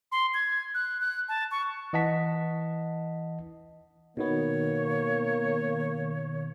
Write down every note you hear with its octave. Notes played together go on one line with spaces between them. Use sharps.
C6
G#6
F#6
F#6
A5
C#6
E3 D#5 F#5 A5 B6
B2 D#3 A#3 B3 C#5